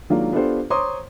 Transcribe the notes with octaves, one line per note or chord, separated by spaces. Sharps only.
D#3 F#3 G#3 A#3 D4 F4
B3 D4 F4 G4 A4 C5
C5 C#5 A#5 C6 D6 D#6